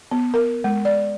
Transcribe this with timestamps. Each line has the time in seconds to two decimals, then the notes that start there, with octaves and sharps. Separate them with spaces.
0.11 B3
0.34 A#4
0.64 G#3
0.85 D5